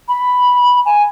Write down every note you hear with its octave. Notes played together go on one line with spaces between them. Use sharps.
B5
G#5